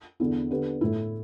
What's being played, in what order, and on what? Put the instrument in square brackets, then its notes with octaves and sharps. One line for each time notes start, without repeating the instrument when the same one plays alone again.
[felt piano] E2 D3 B3 E4
D3 B3 G4 B4
A2 A3 E4